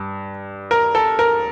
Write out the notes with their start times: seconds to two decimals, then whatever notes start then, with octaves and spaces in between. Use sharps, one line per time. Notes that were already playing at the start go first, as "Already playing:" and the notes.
Already playing: G2
0.71 A#4
0.95 A4
1.19 A#4